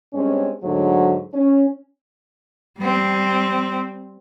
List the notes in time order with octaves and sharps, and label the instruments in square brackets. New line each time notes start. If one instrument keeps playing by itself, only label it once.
[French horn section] G2 G#3 C4 C#4
D2 G#2 D3 F#3
C#4
[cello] G3 C4